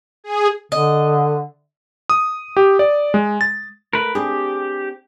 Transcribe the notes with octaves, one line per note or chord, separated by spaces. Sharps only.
G#4
D3 D#5
D#6
G4
D5
G#3
A6
A3 A#4 B4
C4 D4 G4 G#4